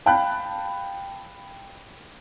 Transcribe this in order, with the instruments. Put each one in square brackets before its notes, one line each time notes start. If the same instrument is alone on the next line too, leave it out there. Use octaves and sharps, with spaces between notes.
[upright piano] F5 G5 A5 B5 F#6